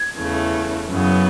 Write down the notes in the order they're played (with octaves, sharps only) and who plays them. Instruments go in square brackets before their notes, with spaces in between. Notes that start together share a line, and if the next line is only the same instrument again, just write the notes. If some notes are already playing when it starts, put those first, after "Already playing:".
Already playing: [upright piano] G#6
[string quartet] E2 C#3 E3 A3
F#2 C#3 E3 B3